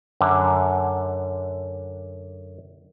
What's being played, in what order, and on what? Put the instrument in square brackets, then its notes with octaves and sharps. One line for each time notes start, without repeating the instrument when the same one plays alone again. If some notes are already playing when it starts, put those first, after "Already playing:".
[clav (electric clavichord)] F#2 D3